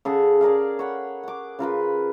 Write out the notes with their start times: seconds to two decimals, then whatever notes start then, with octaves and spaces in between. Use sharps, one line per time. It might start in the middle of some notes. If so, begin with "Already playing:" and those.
0.05 C#3 G#4 A4 F#5
0.41 G#4 A#4 D5 F5
0.79 C#5 F#5 B5
1.23 F#5 D6
1.59 C#3 F4 A#4 B4